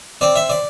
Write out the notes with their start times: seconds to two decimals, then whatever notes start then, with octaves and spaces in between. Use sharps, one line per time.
0.21 C4 D5
0.36 E5
0.50 D5